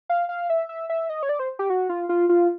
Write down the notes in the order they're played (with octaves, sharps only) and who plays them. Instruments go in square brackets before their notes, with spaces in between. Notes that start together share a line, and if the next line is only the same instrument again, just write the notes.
[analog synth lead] F5
F5
E5
E5
E5
D#5
C#5
D5
C5
G4
F#4
F4
F4
F4